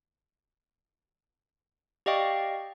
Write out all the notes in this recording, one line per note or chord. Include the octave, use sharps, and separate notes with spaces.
G4 D5 D#5 F5 G5 C#6